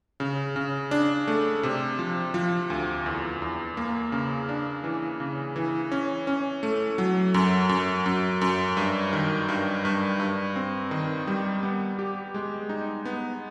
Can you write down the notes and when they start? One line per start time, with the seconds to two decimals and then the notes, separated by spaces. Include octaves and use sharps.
0.20 C#3
0.56 C#3
0.91 D4
1.28 A3
1.63 C3
1.99 F3
2.34 F3
2.70 D2
3.06 E2
3.42 E2
3.77 A#3
4.12 C#3
4.49 D4
4.84 E3
5.20 C#3
5.56 E3
5.92 C#4
6.27 C#4
6.63 A3
6.98 F#3
7.34 F#2
7.69 F#2
8.06 F#2
8.41 F#2
8.77 G2
9.13 D#3
9.49 G2
9.85 G2
10.20 G2
10.56 C4
10.91 D#3
11.27 G3
11.63 B3
11.99 G4
12.34 G#3
12.69 D#4
13.05 B3